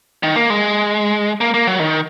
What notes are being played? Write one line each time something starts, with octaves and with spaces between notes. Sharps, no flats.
D#3
A#3
G#3
A#3
A#3
F#3
D#3